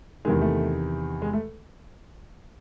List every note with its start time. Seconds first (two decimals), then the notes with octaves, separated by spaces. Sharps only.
0.25 E2 C3 D#3 G#3
0.41 A3
1.22 G#3
1.33 A3